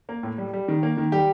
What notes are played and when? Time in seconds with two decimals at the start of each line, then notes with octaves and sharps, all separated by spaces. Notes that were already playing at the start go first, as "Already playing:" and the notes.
0.09 A#3
0.23 A2
0.38 G3
0.53 G3
0.68 D#3
0.83 A#3
0.97 D#3
1.12 G3 G4